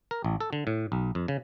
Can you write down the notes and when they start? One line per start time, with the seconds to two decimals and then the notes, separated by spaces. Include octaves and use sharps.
0.11 A#4
0.25 A1
0.40 A4
0.53 D3
0.67 A2
0.92 B1
1.15 F2
1.28 C#3